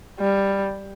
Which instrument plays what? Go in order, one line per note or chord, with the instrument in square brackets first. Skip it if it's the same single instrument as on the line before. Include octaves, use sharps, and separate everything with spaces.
[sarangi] G3